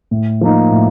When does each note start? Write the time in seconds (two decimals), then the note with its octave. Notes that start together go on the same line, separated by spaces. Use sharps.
0.11 A2
0.41 F3 A#3 D#4
0.71 A2